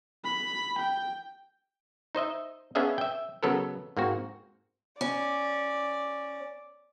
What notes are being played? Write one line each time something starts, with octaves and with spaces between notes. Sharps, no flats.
B5
G5
D#4 C5 D#5 E5
B3 C#4 D4 G#4 E5 F5
E5 G5
C#3 F#3 B3 A4 A#4
G#2 A#3 C4 F#4
C#4 D5